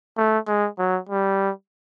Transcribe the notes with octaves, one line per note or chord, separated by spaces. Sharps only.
A3
G#3
F#3
G3